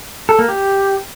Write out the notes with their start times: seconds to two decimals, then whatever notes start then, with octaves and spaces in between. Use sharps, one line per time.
0.29 A4
0.39 A#3
0.49 G4